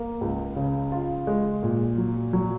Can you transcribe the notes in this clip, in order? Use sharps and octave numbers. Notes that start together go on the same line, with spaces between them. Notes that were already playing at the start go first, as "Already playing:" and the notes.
Already playing: A#3
C#2
C#3
F4
G#3
A#2
F#3
F#3